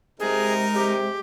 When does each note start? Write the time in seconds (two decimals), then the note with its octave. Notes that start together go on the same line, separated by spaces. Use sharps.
0.20 C3 G#3 D#4 G#4 A#4
0.75 C3 G4